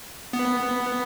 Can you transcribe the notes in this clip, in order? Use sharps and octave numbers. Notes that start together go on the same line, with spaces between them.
B3